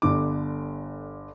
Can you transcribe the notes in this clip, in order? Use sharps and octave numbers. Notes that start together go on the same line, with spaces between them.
G1 D3 D6